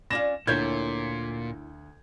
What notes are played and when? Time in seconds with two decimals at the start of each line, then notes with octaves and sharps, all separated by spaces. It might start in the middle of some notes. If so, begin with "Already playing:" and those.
0.10 C#4 D4 F4 A#6 E7
0.47 D2 A#2 E4 A#4 C#5 G6 G#6